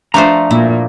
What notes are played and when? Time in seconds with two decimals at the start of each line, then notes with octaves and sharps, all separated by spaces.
0.14 F3 A3 D4 C5 A#5
0.51 A#2 E4